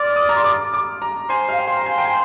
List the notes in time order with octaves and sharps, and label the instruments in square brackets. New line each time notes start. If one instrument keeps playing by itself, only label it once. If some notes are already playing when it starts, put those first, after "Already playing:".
Already playing: [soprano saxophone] D5 [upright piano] C6 F6
[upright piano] D#6
A#5
C6
D6
D6
A#5
[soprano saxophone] C5 [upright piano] G#5
[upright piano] F5
G5
C6
A#5
G#5
G5
G#5